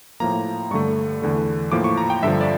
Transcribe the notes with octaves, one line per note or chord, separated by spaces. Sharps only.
A2 F3 A#3 A#5
G2 D3 A3 C#6
E2 D3 A3
A2 F3 A#3 D6
C#6
A#5
G5
G2 D3 F3 E5
D5